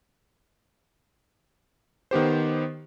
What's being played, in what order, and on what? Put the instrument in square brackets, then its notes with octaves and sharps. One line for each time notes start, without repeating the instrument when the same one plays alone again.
[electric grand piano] D#3 B3 G4 C5